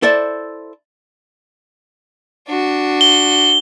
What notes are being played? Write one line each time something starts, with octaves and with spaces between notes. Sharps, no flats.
E4 A4 C5 D5 E5
D4 F#4
G7